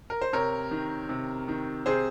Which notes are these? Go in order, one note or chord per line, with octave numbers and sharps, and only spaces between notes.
A#4
C5
C3 A#4 C#5
D#3
C3
D#3
C3 G#4 C5